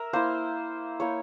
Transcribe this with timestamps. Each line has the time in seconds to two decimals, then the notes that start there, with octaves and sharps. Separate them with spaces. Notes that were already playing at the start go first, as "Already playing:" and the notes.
Already playing: A#4 E5
0.13 A#3 E4 C5
1.00 A#3 E4 C#5